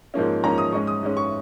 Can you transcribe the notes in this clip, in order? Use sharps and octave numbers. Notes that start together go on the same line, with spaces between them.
G#2 F3 A#3 C#4
G#2 F3 A#3 C#4 A#5
D#6
G#2 G#3 C#4 C#6
D#6
G#2 G#3 C#4
C#6